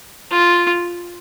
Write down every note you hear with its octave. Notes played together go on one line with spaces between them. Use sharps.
F4